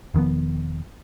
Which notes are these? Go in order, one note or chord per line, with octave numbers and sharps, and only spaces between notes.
E1 D#3 F3 B3